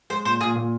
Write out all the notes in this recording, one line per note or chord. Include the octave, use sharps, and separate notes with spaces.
G#3 C5
A#2 C5
A#2 G#4
A#2